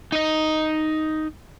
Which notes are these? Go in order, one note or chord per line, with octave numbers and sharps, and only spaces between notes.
D#4 D#5